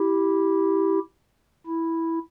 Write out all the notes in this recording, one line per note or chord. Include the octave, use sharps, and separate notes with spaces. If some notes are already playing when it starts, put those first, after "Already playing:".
Already playing: E4 G4
E4